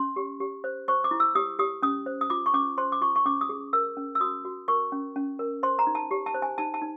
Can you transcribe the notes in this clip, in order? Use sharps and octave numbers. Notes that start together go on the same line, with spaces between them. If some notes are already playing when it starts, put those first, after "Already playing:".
Already playing: C#4 C6
G4
G4
C5
C5 C#6
D6
E4
E6
G4 D#6
G4 D#6
C#4 D#6
C5
D#6
F4 D6
C#6
C#4 D6
C5 C6
D6
F4 C#6
C#6
C#4 D6
D#6
G#4
A#4 E6
C#4
E6
F#4 D#6
F#4
A#4 C#6
C#4
C#4
A#4
C5 C6
A#5
D#4
A5
G4
A5
C5
G#5
D#4 A5
A5
D#4